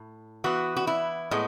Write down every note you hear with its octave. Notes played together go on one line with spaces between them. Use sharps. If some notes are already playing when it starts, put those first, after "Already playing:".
Already playing: A2
E3 B3 F#4
F#4
E4
A2 G#3 B3